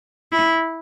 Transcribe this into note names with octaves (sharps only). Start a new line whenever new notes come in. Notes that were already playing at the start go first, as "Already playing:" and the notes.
E4